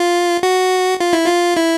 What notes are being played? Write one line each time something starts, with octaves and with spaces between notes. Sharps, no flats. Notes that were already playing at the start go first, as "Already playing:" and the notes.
Already playing: F4
F#4
F4
E4
F4
E4